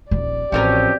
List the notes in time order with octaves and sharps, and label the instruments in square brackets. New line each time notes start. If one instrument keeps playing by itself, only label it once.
[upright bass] D#1 A#1 [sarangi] D5
[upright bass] A1 [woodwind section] B2 C4 G4 [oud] F3 C#4 A#4